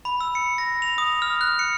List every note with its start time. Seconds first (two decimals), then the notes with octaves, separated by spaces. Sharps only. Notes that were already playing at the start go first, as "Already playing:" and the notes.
0.05 B5
0.21 E6
0.35 C#7
0.58 A#6
0.82 F7
0.98 D#6
1.22 F6
1.41 F#6
1.59 C#7